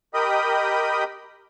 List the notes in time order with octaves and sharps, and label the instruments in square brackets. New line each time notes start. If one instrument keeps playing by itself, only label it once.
[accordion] G4 A#4 D#5 G5 B5 D#6